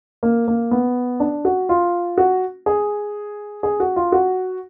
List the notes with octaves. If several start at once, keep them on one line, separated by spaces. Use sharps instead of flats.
A#3
A#3
B3
D4
F#4
F4
F#4
G#4
G#4
F#4
F4
F#4